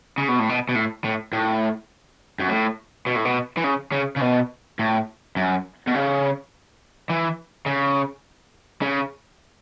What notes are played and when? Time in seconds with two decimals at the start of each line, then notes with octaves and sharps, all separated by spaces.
0.18 C#3
0.28 B2
0.39 A2
0.49 B2
0.69 B2
0.75 A2
1.04 A2
1.33 A2
2.40 F#2
2.49 A2
3.07 B2
3.16 A2
3.25 B2
3.57 E3
3.64 C#3
3.92 C#3
4.17 C#3
4.22 B2
4.79 A2
5.36 F#2
5.87 B2
5.95 C#3
7.10 E3
7.66 C#3
8.82 C#3